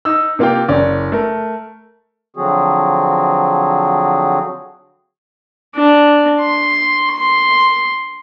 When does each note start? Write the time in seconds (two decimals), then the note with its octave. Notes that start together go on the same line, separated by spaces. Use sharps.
0.05 D#4 E6
0.39 C3 A#3 F4 F5 G5
0.68 F#1 C#4 D5
1.12 A3 A#4
2.36 D3 F3 F#3 C4 F#4 G#4
5.76 D4
6.40 C6
7.16 C6